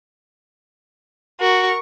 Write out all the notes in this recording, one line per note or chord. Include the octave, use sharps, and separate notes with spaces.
F#4 A#4 C#6